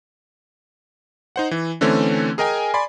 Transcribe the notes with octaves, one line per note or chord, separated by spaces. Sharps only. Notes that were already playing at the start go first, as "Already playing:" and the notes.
D#4 C5 F#5
E3
D3 E3 A3 C4 C#4
G#4 A#4 D#5 G5 G#5
D5 G#5 B5 C6